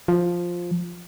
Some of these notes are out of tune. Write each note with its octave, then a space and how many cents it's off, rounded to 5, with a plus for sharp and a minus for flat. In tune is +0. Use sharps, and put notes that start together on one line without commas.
F3 +5